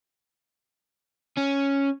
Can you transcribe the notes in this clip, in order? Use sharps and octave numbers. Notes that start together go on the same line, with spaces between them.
C#4